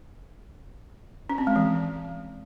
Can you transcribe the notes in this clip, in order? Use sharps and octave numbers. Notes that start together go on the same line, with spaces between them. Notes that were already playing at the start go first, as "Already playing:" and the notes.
C#4
C4
G#3
E3